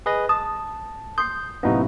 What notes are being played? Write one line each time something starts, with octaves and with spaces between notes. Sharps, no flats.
G#4 B4 D#5
A5 D#6
C6 D#6 G6 C7
F#2 A2 C3 B3 D#4 F5